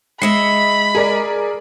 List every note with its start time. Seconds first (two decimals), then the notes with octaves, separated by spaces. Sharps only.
0.22 G#3 D#5 E5 B5 C7 C#7
0.95 G#4 A#4 D5